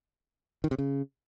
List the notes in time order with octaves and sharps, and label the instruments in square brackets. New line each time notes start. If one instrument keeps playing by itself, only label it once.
[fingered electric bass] D#3
C3
C#3